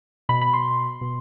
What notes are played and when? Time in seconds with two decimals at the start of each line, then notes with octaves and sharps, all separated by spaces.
0.29 B2 B5
0.41 B5
0.53 C6
1.01 B2